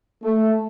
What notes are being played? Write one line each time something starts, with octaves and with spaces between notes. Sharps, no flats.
A3